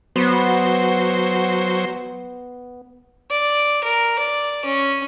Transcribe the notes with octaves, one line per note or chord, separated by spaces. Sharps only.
F#3 B3 C5
D5
A#4
D5
C#4